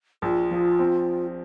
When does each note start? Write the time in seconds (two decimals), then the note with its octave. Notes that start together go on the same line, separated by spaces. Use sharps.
0.22 A#1 F4
0.51 F3
0.79 C4